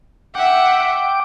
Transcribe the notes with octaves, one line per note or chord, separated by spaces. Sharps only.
E5 F#5 G5 D6